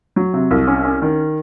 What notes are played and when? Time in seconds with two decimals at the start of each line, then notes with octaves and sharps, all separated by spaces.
0.16 F#3
0.33 C3
0.51 C2
0.67 C#4
0.85 C#4
1.02 D#3